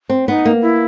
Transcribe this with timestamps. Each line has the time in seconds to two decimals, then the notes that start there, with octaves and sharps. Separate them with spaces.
0.09 C4
0.27 B3 D#4
0.45 A#3
0.62 E4